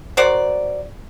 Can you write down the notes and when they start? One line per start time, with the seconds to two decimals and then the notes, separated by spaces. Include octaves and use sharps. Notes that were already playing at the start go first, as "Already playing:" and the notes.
0.17 F#4 A#4 C5 D5